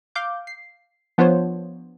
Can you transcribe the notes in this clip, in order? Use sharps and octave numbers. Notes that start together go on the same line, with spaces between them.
F5 D6 G6
C7
F3 B3 D4 F4 C5 C#5